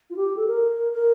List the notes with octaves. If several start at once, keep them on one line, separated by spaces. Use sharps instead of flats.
F4
G4
A4
A#4
A#4